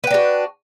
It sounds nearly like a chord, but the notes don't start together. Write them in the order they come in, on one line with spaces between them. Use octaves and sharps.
B4 G5 D4 F#4